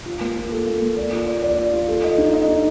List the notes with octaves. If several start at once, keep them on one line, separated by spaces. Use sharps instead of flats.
F4
A#3
F4
A4
A#3
A#3
D5
F4
D5
D5
F4
F4
A4
D#5
D#4
D#5
D#4